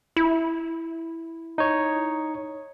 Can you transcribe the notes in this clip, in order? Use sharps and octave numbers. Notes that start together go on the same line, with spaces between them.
E4
D#4 C#5